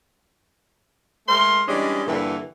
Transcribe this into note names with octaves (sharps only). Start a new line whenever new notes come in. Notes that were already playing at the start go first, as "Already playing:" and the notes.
G#3 A3 A#4 C6
E3 G3 G#3 C#4 D4 D#5
G2 A#2 D3 E3